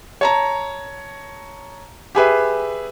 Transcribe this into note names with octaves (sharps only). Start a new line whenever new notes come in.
C#5 A5 A#5
G4 G#4 B4 E5